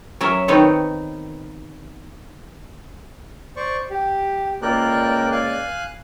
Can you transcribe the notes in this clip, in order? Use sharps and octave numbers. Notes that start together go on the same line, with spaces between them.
F#3 C#4 A#4 E5
D#3 B3 C4 D#4 C#5
C5 D5 C#6
G4
C#2 A#3 A#4 D5 G5 F#6
F5 G#5 F#6